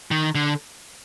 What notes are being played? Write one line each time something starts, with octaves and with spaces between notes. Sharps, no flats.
D#3
D3